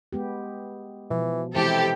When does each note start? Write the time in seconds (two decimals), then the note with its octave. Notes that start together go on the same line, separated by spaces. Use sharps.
0.13 G#3 B3 G4
1.10 B2 E3 F3
1.55 C3 E3 G#3 E4 G4 A4